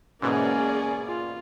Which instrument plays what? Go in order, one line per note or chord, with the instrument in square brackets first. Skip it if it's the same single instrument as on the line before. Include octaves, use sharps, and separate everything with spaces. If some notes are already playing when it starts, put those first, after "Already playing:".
[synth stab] G#2 B2 E3 [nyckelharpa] A#3 [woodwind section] C#4 [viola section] G#4 D5
[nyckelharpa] F4